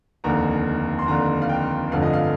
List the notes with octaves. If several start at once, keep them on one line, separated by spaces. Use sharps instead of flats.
F1 D#2 D3 A#5
C6
F1 D#2 D3 A#5
F5
G5
G1 F2 D3 F3 A3 F5
D#5
F5